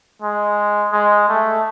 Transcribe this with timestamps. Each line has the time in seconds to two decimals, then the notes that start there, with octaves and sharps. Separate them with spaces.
0.22 G#3
0.93 G#3
1.29 A3